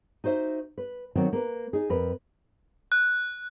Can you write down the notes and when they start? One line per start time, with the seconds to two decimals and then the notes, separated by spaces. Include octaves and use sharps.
0.24 D#4 F#4 C5 D5 E5
0.78 B4
1.15 D#3 F#3 B3 C4 D4 F#4
1.33 A#3 B4
1.73 D#4 G#4
1.90 F2 A#4 B4
2.92 F#6